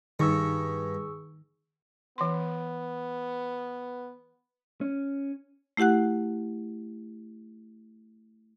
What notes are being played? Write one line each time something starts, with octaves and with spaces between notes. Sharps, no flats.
G2 D#3 G#4 C#6 E6
E3 B3 C6
C#4
A3 E4 G4 F#5 F#6